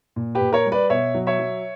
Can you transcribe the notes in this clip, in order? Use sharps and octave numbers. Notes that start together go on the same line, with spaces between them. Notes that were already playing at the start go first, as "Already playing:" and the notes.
A#2
G4 B4
A#2
A#4 C#5
G3
B4 D5
B2 C#5 E5
F#3
C#5 E5
F#3